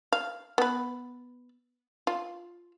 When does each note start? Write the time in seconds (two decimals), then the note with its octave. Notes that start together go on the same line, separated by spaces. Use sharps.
0.13 F5
0.58 B3 B4
2.07 F4